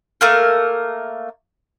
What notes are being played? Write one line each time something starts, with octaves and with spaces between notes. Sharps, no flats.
A3 A#3 A#4